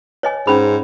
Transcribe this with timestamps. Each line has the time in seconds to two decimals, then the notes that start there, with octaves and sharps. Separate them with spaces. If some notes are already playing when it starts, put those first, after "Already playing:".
0.23 C#5 D#5 G#5
0.47 G#2 C#4 B5